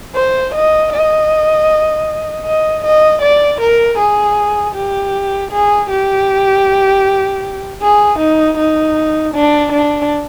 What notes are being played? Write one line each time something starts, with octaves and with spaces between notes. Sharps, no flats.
C5
D#5
D#5
D#5
D#5
D5
A#4
G#4
G4
G#4
G4
G#4
D#4
D#4
D4
D4